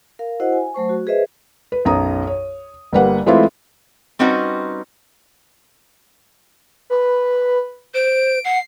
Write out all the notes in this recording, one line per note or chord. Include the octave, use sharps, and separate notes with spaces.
A#4 F5
E4 F#4 C5 D#5 F#5
G#5
F#3 A3 C5 C#6
F#4
G#4 B4 C5 D#5 E5
B4
B1 F#2 A#5 D#6
C#5
G1 G3 A#3 B4 F#5
E3 G#3 A3 C4 E4 F4
G3 C4 C#4 D#4 F#4 B4
B4
C5 D7
F#5 C7